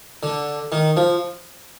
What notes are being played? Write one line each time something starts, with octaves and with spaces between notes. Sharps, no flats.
D3
D#3
F3